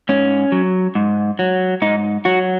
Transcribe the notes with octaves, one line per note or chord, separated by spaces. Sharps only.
G#2 C#4
F#3
G#2
F#3
G#2 D#4
F#3 F#4